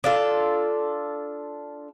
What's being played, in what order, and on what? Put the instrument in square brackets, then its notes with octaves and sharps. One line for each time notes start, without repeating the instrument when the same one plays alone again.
[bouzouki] D4 F4 A4